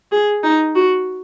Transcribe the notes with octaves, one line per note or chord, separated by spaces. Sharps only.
G#4
D#4
F#4